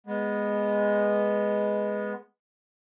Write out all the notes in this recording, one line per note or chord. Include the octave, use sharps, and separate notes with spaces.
G#3 B3